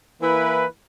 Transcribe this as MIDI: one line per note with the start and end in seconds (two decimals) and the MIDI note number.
0.22 0.65 52
0.22 0.65 58
0.22 0.65 64
0.22 0.65 71